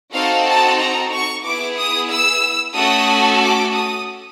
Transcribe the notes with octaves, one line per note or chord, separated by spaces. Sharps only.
C4 D#4 F#4 A4 F5
A5
A#5
C#6
B3 E4 G#4 D6
D#6
E6
A3 C#4 F#4 A4 D#6
D6
D#6